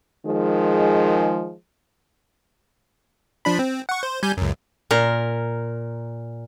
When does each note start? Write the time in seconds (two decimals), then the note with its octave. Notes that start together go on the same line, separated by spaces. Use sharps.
0.25 D#3 F3 G#3
3.45 F3 D4 B5
3.59 C4
3.89 F#5 C#6
4.03 C5
4.23 G3 G#5 G6
4.37 C#2 F#2
4.91 A#2 A#4